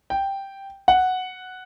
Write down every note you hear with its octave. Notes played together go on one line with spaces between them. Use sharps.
G5
F#5